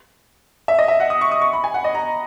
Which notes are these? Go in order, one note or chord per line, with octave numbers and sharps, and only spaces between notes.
E5
D#5
E5
F#5
D#6
C#6
D#6
C#6
B5
G#5
F#5
D#5
A#5